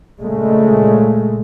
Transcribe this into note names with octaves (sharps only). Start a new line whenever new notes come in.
A#2 C#3 G#3 A3